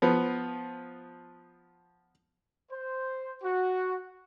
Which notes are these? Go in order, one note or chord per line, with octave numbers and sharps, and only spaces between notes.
F3 B3
C5
F#4